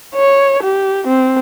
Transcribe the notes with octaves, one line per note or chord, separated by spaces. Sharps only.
C#5
G4
C4